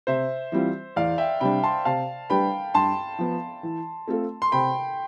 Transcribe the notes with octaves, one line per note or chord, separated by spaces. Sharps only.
C3 C5 E5
E3 G3 C4 F4
E2 D5 F5
E5 G5
C3 G3 D4 G5 B5
A5 C6
C3 F5 A5
G3 D4 G4 B4 G5 B5
G2 A5 C6
F3 B3
E3
A3 C4 F4 A4
C6
C3 G5 B5